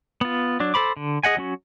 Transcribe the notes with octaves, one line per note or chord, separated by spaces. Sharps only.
B3 F4
F#3 D4
A4 C5 B5 D6
D3
G#4 D#5 F#5 G#5
F#3 C#4 F#4